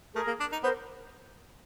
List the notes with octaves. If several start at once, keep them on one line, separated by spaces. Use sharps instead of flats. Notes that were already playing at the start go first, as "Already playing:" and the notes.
A3 G#4 A#4
A#3
D4
D#4
B3 A#4 C5